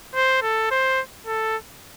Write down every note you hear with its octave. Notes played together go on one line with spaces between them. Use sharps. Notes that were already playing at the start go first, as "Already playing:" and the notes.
C5
A4
C5
A4